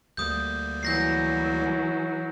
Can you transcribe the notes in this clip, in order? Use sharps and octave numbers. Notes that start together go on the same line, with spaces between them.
D2 G3 A#3 D#6 G6
E3 F#3 G6 A#6 C7